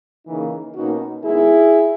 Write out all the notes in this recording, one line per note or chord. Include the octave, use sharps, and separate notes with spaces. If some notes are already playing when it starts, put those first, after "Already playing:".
C#3 E3 A#3 D#4
B2 A#3 C#4 D#4 F#4
D#3 G#3 B3 D#4 E4 G#4